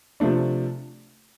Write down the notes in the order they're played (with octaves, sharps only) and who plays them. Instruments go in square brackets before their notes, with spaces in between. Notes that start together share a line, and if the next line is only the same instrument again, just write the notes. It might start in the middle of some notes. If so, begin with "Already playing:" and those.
[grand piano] C3 F3 A3 D4